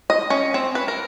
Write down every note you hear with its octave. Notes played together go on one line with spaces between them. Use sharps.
D#5
C#4
C4
B4
A#4